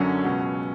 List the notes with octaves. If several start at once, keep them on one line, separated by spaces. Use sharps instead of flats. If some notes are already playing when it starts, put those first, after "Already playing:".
Already playing: F#2 D3 F#3 C#4
C#2 B2 F#3